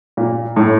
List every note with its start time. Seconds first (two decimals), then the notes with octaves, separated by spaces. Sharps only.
0.17 A#2
0.56 A2